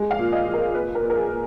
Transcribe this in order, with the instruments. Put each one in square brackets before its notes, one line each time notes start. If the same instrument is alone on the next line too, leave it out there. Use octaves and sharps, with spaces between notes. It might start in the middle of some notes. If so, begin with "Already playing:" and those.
Already playing: [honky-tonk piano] G#3
F5
A#2
D#5
F3
A#4
A#2 B4
A#4
A#2
A#4
G#4
A#2